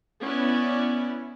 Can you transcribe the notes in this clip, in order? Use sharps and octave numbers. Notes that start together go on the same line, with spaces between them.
B3 C#4 E4 D5